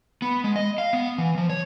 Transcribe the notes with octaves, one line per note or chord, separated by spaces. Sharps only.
B3
G#3
D#5
F5
B3
E3
F3
C#5